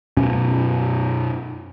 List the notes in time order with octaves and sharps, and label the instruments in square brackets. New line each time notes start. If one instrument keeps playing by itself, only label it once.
[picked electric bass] F#2 B2 C#4